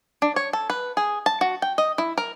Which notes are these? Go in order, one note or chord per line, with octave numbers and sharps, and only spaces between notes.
D4
C#5
A4
B4
G#4
A5
F#4
G5
D#5
E4
A#4